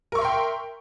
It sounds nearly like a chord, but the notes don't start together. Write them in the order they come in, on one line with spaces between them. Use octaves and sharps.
A#4 C#6 E5 C6 G5